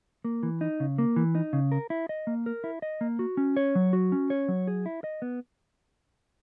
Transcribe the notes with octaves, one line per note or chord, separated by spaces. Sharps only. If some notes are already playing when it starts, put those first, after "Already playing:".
A#3
E3
D#4
C#3
A#3
E3
D#4
C#3
A#4
E4
D#5
A#3
A#4
E4
D#5
A#3
F#4
C#4
C#5
F#3
F#4
C#4
C#5
F#3
G#4
E4
D#5
B3